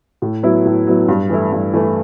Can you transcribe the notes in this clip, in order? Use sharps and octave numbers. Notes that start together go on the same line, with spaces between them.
A2
F#3 B3 E4
A2
F#3 B3 E4
G2
E3 A3 E4
G2
E3 A3 E4